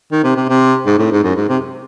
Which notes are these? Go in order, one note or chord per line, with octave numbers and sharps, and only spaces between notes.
D#3
C3
C3
C3
G#2
A2
G#2
F#2
G#2
C3